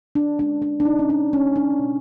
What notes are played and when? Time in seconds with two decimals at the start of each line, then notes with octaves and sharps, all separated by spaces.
0.15 D4
0.39 G#3 C#4 D4
0.62 D4
0.80 D4
0.85 B2 D#4
0.99 C#4
1.10 D4
1.33 G#3 C#4
1.56 D4
1.79 B2